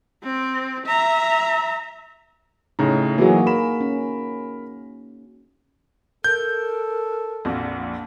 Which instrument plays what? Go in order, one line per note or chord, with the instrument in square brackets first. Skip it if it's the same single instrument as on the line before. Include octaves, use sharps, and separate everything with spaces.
[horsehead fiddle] C4
E5 A#5
[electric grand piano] A2 C#3 A#5 [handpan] D#4
[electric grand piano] E3 F#3 [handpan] A#3 F#4 G#4
[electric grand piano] A#4 B5 E7
[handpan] C#4
[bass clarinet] A4 [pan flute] A#4 [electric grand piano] G6
[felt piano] A#1 F2 [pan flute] F#5